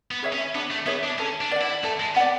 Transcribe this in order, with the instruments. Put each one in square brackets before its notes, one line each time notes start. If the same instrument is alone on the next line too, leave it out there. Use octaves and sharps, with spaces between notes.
[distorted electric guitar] B3
[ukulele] G#4 C#5 E5
[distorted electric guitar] C#4
[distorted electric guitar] B3 [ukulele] D4
[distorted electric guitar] A3
[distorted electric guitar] B3 [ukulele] G#4 C#5 E5
[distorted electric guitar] D4
[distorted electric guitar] C#4 [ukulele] A4
[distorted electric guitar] D4
[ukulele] D5 F#5
[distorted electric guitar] E4
[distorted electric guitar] A3 [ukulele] A4
[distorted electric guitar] G#3
[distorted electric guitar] B3 [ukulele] D5 F#5